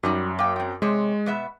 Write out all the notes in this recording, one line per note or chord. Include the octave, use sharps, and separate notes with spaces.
F#2 G3 D#4 F#4
A#3 G5
C4 G5
C3 G#3 C#5
B2 B3 E5